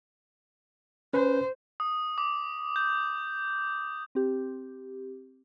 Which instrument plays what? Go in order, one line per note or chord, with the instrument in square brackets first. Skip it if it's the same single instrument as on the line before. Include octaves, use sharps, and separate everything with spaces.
[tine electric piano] C#4 B4 [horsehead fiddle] C5
[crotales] D#6
D6
G6
[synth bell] C4 G4